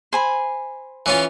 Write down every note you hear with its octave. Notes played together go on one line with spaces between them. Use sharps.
C5 G#5 B5
E3 C#4 F4